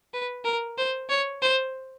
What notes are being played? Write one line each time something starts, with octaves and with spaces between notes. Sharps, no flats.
B4
A#4
C5
C#5
C5